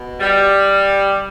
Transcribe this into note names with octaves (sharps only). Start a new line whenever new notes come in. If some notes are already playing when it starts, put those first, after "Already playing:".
Already playing: B2
G3